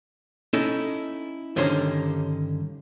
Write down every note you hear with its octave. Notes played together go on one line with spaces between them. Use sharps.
C#4 D#4 E4 A4 D#5
G2 D3 D#3 C#4 C5 A#5